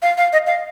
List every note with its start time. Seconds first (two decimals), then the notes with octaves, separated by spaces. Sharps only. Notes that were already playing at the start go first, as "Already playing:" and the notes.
0.02 F5
0.17 F5
0.33 D#5
0.47 F5